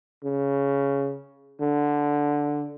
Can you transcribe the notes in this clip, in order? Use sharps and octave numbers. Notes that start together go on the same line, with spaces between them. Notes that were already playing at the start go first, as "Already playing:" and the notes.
C#3
D3